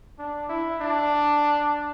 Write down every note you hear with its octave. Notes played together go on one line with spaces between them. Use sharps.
D4
E4
D4